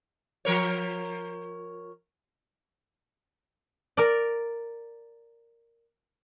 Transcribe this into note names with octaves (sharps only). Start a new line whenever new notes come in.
F3 A#4 C#5
A#4 D5